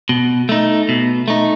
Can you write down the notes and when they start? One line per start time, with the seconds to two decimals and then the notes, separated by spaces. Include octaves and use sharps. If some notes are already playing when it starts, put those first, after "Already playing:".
0.09 B2
0.49 A3 D#4
0.89 B2
1.28 A3 D#4